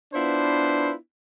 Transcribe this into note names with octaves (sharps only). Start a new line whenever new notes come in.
B3 D4 E4 F4 B4 C5